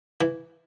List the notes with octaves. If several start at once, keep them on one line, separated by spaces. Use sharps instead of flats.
E3